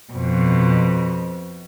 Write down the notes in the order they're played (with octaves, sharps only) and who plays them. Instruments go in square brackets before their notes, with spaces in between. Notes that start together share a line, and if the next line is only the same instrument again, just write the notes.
[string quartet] F2 B2